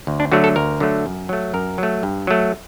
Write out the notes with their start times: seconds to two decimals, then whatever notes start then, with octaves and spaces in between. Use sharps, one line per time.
0.07 D2
0.20 D4
0.32 D3 F#3 A3 F#4
0.44 A4
0.56 D2 A#4
0.80 D3 F#3 A3
1.06 F#2
1.29 F#3 A3
1.54 F#2 A#4
1.78 F#3 A3
2.03 G2
2.27 F#3 A3